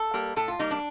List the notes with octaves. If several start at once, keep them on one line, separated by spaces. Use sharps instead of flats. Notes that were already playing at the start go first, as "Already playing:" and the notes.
Already playing: A4
G3 A#3
A2 A4
F4
G3 A#3 D#4
D4